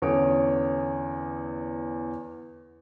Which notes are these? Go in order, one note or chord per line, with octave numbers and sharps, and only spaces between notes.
E2 D3 C#4 C#5 D#6 D7